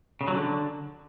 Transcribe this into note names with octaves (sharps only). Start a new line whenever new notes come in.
C#3
F#3
D3